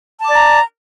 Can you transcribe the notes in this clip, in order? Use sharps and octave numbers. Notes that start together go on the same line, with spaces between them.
D5 A5 A#5 D6